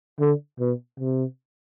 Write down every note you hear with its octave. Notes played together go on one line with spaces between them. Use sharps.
D3
B2
C3